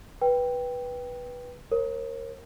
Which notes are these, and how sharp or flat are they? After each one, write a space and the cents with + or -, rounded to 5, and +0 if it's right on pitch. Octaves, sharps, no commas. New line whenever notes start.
B4 -10 G5 +0
A#4 +0 C#5 -45